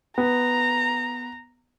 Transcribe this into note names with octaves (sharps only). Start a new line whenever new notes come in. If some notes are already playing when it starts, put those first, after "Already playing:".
B3 A#5